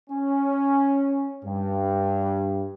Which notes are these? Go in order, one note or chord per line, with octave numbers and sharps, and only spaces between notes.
C#4
G2